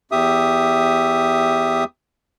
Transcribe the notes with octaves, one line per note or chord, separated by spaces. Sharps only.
E2 G4 E5 D#6